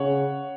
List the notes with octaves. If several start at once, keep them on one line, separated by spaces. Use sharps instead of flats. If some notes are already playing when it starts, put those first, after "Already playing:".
Already playing: C#3 C#5 F#5